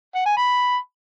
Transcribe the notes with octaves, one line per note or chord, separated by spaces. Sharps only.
F#5
G#5
B5